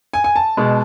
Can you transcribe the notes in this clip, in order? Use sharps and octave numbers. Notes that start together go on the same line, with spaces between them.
G#5
G#5
A5
B2 G#3